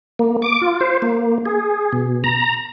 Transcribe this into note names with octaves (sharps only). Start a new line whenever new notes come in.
A#3
D6
F4
C5
A#3
G#4
B2
A#5